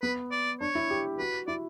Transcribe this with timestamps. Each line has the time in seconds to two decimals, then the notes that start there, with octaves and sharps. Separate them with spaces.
0.02 B3 B4
0.31 D5
0.61 D4 C#5
0.75 E4
0.90 G4
1.19 F#4 B4
1.48 E4 D5